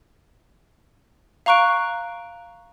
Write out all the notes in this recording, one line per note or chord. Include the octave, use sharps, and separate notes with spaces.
F5 A#5 C#6 F#6 D7